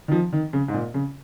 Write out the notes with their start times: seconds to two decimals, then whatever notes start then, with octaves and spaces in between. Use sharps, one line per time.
0.08 D#3
0.12 F3
0.33 D#3
0.53 C#3
0.68 G#2
0.74 A#2
0.94 C#3